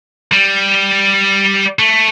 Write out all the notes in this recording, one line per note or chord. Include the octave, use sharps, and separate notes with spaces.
G3
A3